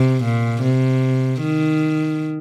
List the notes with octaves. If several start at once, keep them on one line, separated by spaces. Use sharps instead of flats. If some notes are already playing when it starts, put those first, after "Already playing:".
Already playing: C3
A#2
C3
D#3